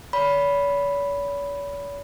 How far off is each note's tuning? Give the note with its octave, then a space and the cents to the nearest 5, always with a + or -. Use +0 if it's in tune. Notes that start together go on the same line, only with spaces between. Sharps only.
C#5 +45 B5 +0